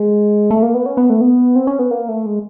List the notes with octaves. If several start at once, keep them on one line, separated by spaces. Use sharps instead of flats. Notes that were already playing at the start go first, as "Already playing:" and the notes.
Already playing: G#3
A3
A#3
B3
C#4
B3
A3
B3
C4
C#4
B3
A#3
A3
G#3